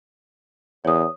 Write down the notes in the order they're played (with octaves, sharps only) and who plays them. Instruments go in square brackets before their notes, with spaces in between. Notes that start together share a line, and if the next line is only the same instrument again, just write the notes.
[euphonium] E2 [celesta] C#5 D#6